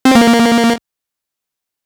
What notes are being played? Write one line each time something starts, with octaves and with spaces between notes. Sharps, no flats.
C4
A#3